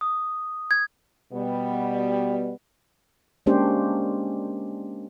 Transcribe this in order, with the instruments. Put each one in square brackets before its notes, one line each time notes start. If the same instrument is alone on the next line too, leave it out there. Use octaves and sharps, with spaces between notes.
[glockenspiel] D#6
G#6
[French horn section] B2 G3 B3
[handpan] G#3 A#3 C#4 D4 G4 C5